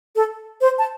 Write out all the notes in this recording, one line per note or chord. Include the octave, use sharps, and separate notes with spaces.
A4
C5
A5